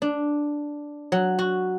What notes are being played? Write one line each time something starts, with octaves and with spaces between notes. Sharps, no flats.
D4
F#3
F#4